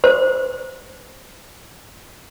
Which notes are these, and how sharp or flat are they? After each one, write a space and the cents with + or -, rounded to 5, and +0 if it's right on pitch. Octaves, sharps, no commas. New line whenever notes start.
C5 +0